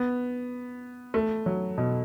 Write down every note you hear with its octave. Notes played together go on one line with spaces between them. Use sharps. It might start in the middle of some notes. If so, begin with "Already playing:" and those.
Already playing: B3
A3
F#3
B2